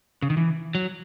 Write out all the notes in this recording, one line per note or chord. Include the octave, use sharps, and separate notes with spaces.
C#3
D#3
E3
F#3